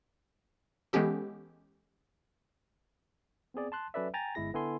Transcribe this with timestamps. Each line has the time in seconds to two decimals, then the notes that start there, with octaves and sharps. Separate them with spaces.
0.93 E3 G#3 B3 C#4 G4 A4
3.54 B3 C4 G#4 D5
3.72 A5 C6 F#6
3.94 F#3 C#4 A4 B4 D5 E5
4.14 G5 G#5 A#5 A6
4.35 G1 G#3 E4 G#4 A#6
4.53 D3 B3 E4 A4 G#5 C6